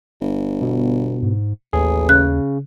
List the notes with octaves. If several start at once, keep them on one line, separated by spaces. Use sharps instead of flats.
G1
B2
G#2
A1 D#2 G#4
C#3 F#6